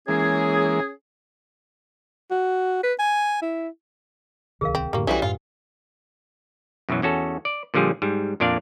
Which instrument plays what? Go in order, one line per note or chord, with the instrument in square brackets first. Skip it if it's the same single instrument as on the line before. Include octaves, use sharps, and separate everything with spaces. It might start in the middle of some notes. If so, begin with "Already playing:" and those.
[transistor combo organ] E3 G#3 A#3 [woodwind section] C#4 G#4
[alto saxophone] F#4
B4
G#5
E4
[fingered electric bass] D1 C2 D#3 [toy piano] G#4 A#4 F5
[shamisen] C4
[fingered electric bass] F#2 A2 D3 [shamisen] G3 A#3 [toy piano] G4
[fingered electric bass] B1 [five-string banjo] E3 G3 F#4 [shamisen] C#4 [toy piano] A4 F#5 G#5
[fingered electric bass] F#2 A2 [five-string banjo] F4
[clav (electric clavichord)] F#2 B2 E3 F#3
E2 C#4 F#4 A4
D5
A#2 D3 F3 G3 G#4
G#2 G3
F2 A#2 D4 D5 F5